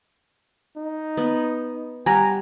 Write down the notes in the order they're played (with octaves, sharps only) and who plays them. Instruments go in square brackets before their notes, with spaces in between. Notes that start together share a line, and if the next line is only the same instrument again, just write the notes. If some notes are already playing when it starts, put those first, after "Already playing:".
[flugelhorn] D#4
[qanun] B3
[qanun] G3 [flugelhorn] F#5 [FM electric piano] G#5 A#5